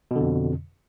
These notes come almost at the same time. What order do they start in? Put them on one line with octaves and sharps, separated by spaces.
B2 D3 F2